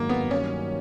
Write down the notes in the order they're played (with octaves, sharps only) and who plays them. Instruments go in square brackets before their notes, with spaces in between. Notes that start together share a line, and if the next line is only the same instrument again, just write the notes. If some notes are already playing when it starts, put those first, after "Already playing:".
Already playing: [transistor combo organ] G#2 D#3 F#3 [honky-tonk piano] A#3
[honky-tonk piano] B3
[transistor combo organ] G2 D#3 F#3 A#3 [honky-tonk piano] C#4